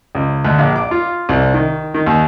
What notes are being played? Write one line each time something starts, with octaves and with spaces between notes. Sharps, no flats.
C#2
D2
A#1
D6
F4
C2
D#3
D#3
D#2